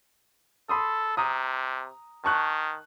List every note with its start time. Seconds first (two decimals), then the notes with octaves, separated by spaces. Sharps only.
0.69 A4 B5 C6 D#6
1.17 C3 A#5 D#6
2.25 D#3 A5 C#6 F#6